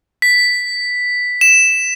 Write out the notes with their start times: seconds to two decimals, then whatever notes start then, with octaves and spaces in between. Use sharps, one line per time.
0.22 B6
1.41 E7